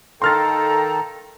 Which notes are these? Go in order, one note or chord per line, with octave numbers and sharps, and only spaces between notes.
D#3 A4 F5 G5 A#5 C6 F6 A6